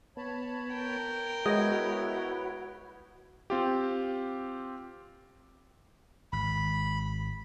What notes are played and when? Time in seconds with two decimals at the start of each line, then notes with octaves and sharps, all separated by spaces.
0.17 B3 C#5 A5 B5
0.72 A#4 G5
1.46 G#3 B3 E4 F#4 B4 C#5 D#5
3.50 C4 F4 G4
6.33 G#1 B5